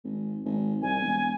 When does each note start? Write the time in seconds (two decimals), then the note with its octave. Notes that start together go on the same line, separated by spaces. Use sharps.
0.04 G#1
0.45 G#1
0.82 C2 G#5
1.01 E1